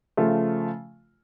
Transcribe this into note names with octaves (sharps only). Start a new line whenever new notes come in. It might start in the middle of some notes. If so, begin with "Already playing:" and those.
C#3 F3 A3 F4